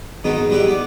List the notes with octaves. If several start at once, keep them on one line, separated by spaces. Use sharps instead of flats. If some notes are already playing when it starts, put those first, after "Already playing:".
G#2 B2 D#3 B3 D#4
G3 E4 G4 B4
B3 D5